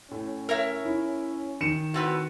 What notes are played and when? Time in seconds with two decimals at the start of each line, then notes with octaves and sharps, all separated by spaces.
0.11 A2 C#4
0.49 A#4 C#5 E5
0.85 E4
1.61 D#3 C#7 E7
1.94 A2 C4 F#4 B4